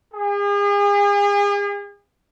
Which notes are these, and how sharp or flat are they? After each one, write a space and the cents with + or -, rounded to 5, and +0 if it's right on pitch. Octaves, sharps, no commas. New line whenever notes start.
G#4 -40